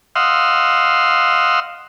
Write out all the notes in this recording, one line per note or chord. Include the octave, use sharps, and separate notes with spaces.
D#5 F5 F#5 C6 E6